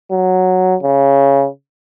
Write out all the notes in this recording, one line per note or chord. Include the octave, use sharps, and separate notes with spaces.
F#3
C#3